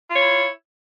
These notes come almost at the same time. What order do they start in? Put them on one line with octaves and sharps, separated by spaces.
F4 C#5 E4